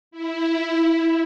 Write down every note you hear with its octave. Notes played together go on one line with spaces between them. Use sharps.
E4